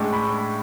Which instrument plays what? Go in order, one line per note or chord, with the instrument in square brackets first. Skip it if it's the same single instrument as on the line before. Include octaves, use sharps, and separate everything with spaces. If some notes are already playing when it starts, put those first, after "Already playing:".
Already playing: [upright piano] A2 G#3 D4 C#6
B5